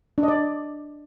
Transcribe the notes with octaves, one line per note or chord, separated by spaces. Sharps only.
D4
D#5
D5